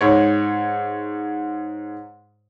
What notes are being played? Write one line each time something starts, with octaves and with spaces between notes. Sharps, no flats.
G#2 C#5